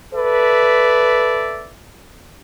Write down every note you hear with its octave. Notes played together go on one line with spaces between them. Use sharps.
A4 B4 D5 E5